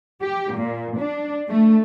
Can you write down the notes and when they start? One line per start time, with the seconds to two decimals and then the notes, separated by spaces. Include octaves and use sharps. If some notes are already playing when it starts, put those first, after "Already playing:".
0.23 G4
0.57 A#2
0.99 D4
1.48 A3